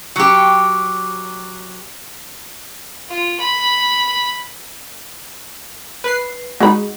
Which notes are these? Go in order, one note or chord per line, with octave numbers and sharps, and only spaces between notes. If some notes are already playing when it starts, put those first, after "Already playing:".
F#3 G4
F4
B5
B4 C7
G#3 D#4 F#4 B5